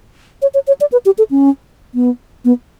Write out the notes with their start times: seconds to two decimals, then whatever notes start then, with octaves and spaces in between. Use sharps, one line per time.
0.42 C#5
0.54 C#5
0.67 C#5
0.81 D5
0.92 B4
1.06 G4
1.18 A4
1.31 C#4
1.95 B3
2.45 B3